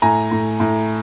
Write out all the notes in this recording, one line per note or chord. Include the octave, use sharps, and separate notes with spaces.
A2 G#5 A#5
A2
A2